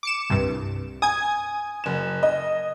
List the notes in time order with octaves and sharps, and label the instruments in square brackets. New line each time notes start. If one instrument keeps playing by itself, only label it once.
[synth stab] D6 C#7 E7
C2 G2
[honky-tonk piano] G#5 [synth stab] D#6 G#6
[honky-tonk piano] F#1 E7
D#5